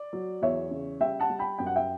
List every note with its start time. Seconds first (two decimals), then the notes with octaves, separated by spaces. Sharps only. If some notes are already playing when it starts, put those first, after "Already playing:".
Already playing: D5
0.13 F#3
0.42 E2 C#5 E5
0.71 C#3
1.00 G3 E5 G5
1.20 F#5 A5
1.30 G3
1.39 G5 B5
1.58 F#2 G5
1.66 F#5
1.76 E5 G5